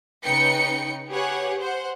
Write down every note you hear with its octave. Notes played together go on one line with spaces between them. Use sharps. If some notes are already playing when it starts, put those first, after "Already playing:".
C#3 D#4 B4 G5 C#7
G4 G#4 B4 C#5 F#5
C5 F#5